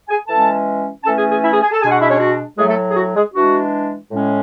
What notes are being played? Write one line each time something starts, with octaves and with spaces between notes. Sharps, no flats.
G#4 G#5
E3 G#3 C#4 A4 A5
E3 A3 C#4 A4 A5
G#4 G#5
G#4 G#5
E4 E5
G#4 G#5
G#4 G#5
A4 A5
B2 G#3 D4 G#4 G#5
F#4 F#5
E4 E5
C#4 C#5
F#4
A2 F#3 G#3 A3 G#4
A3 A4
G#4
F#4
G#3 G#4
E3 G#3 D4 F#4
A2 G#3 C#4